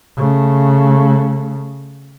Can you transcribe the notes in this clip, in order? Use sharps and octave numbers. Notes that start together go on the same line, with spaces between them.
C#3 A3